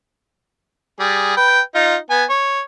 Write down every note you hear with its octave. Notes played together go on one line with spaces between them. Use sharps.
G3 G#4
B4 G5
D#4 F4
B3 G#5
C#5